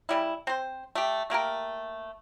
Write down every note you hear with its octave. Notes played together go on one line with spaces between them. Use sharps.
C#3 G3 E4
C4 C5
A3 G4
A3 A#3 G4 A#4